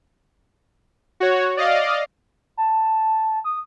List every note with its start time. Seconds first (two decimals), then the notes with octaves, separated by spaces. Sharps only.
1.20 F#4 C#5
1.57 D5 D#5 F5
2.57 A5
3.44 D#6